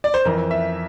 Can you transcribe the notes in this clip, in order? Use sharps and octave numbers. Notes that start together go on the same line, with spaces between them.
D5
C5
F2 E3 A#4
E5